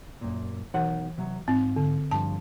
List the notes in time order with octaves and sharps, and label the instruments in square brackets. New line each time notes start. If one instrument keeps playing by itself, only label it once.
[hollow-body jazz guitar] F#2 A#2
[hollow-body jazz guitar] B1 D#3 F#5 [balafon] E3
[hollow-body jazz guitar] C3 F#3
[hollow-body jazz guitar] G#2 F4 [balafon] C4
[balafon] D3
[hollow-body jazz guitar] G2 F3 [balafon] A5